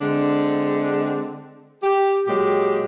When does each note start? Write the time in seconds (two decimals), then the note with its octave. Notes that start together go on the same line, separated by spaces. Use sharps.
0.01 D3 G#3 C4 D4
1.83 G4
2.27 A#2 F#3 G#3 G4